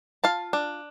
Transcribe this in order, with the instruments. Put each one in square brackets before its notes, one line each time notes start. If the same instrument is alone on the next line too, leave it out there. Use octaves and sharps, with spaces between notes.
[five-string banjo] F4 F5 A5
D4